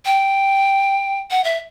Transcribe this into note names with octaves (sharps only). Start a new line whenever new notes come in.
G5
F#5
E5